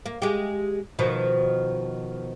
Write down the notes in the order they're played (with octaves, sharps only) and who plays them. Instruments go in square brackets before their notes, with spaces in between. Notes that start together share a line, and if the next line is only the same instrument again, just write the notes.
[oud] A#3
G#3 G4
B2 D#3 F3